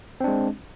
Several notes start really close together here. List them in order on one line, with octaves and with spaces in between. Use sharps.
C4 D4 G#3